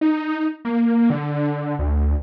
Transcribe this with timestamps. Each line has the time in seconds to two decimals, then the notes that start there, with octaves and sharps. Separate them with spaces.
0.01 D#4
0.65 A#3
1.10 D3
1.79 D2